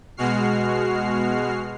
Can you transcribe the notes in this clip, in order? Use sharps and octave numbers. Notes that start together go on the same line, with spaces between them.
B2 G#3 F#4 F6 C7